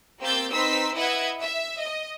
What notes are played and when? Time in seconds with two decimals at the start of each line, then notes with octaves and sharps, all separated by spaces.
0.21 A#3 C4 G4 E6 G6 A6
0.53 C4 D#4 B4 C6 E6 B6
0.95 E4 B4 D#5 E5 F#5 G#6
1.41 E5
1.79 D#5